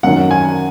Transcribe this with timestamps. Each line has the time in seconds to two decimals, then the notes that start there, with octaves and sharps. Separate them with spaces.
0.03 F#2 D#3 F#3 F#5
0.31 G#5